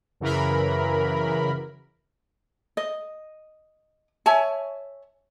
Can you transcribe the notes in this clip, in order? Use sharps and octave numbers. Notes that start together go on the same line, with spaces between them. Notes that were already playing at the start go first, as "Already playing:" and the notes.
F#2 C#3 E3 A#4 B5
D#5
C#5 E5 G#5 A5